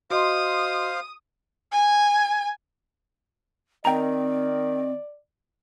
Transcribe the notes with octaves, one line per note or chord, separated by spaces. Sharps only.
F#4 C5 D#5 F5 C6 D#6
G#5
D#3 C4 D5 G5 A#5